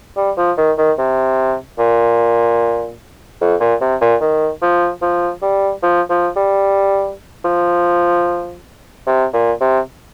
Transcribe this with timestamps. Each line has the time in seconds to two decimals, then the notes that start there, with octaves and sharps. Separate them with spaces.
0.17 G3
0.38 F3
0.58 D#3
0.78 D#3
0.98 C3
1.78 A#2
3.41 F2
3.60 A#2
3.81 C3
4.01 A#2
4.21 D#3
4.62 F3
5.02 F3
5.42 G3
5.83 F3
6.10 F3
6.36 G3
7.45 F3
9.06 C3
9.33 A#2
9.60 C3